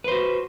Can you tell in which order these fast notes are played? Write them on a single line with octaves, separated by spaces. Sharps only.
B4 C5 F#4